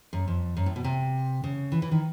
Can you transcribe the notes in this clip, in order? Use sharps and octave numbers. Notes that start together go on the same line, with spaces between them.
F#2
F2
F#2
A2
B2
C3
C#3
E3
E3
D#3